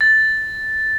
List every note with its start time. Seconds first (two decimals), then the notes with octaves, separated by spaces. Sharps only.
0.01 A6